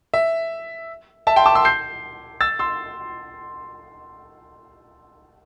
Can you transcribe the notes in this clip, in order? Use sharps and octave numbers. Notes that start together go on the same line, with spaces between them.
E5
E5 A5
G5 C6
A5 D6
C6 E6
G6 C7
E6 A6
C6 E6